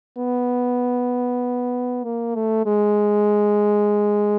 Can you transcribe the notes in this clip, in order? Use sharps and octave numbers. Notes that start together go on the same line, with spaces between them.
B3
A#3
A3
G#3